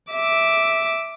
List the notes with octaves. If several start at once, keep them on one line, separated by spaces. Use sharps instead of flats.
E5 D6